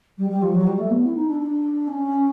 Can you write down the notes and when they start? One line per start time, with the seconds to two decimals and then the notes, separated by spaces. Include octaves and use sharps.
0.18 G3
0.29 G3
0.42 F3
0.54 F#3
0.66 G3
0.78 A3
0.90 B3
1.03 E4
1.14 D#4
1.27 D4
1.39 D4
1.87 C#4